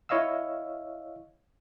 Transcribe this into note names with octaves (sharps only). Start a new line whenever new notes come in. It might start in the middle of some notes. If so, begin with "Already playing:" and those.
E4 C#5 D#5 F5 E6